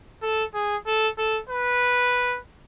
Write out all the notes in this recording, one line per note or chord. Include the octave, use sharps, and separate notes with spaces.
A4
G#4
A4
A4
B4